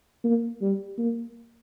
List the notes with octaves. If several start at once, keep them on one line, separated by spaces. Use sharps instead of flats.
A#3
G3
A#3